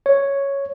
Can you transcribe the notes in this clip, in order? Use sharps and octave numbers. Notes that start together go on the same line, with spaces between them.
C#5